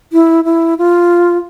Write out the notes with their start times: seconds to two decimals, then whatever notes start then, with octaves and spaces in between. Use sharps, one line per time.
0.13 E4
0.45 E4
0.78 F4